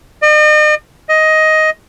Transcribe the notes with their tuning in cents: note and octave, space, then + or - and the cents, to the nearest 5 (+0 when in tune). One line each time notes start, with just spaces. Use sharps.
D#5 -45
D#5 +10